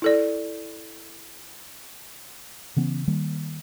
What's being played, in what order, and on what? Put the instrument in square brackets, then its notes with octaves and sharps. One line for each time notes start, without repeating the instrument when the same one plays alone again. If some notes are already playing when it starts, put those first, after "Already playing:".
[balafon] E4 A4 D5
[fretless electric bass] C#3 E3 B3 C#4
D#3 G3 A#3